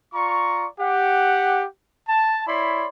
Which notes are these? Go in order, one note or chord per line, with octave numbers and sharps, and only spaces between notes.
F4 D5 A#5 C#6
G4 F#5
A5
E4 C#5 D5 B5 C6